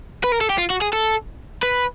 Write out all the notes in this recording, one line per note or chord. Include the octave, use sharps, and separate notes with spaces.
B4
A#4
A4
G4
F4
F#4
G#4
A4
B4